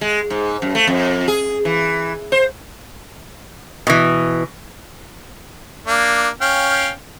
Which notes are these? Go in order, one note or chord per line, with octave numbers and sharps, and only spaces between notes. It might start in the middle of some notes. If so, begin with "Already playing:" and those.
G#3
G#2
F#2
A3
F2
G#4
E3
C5
B2 E3
A#3 D4
C#4 F5 G5